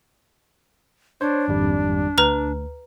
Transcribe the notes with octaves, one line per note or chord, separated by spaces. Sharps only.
D4 C5 C#5
G#1 F2 G3
D2 B4 A#5 F6